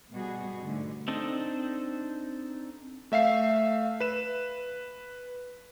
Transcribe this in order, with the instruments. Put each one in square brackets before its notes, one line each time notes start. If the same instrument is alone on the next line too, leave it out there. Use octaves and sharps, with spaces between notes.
[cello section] B2 G3 F#4 G#4
G#2 D3 A3
[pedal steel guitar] C4 D4 D#4 A4 D#5
[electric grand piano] A3 E5 F5 C7
B4 E7